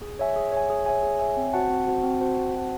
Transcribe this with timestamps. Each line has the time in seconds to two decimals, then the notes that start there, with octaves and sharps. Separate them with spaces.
0.02 G#4
0.19 C#5 E5 G#5
0.36 G#4
0.52 C#5 E5 G#5
0.70 G#4
0.86 C#5 E5 G#5
1.03 G#4
1.19 C#5 E5 G#5
1.37 C4
1.53 F#4 C5 F#5 A5
1.70 C4
1.87 F#4 C5 F#5 A5
2.04 C4
2.21 F#4 C5 F#5 A5
2.37 C4
2.55 F#4 C5 F#5 A5